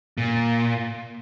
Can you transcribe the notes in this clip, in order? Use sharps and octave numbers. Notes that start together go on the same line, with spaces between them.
A#2